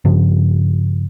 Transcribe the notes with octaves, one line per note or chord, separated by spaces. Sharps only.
G2 C#3 F3